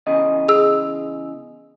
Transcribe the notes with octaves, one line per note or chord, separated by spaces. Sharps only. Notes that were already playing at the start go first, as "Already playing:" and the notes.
E2 C#3 D#5
G#4 E6